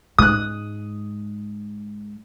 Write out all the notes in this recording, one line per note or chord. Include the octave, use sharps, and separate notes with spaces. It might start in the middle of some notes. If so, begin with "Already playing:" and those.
G#2 G#3 D#6 F#6